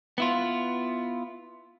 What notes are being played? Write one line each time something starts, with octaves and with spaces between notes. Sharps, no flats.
B3 E4 F4